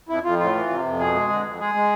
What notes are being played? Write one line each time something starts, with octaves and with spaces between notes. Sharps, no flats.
F2 E4
F2 F4
A2 F4
E3
C3
F2
B2 G#4
G#3
D3
F2
G#3 G#4
G#3